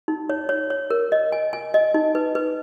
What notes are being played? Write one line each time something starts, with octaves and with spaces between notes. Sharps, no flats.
D#4
C#5
C#5
C#5
A#4
D#5
G#5
G#5
D#5
D#4
B4
B4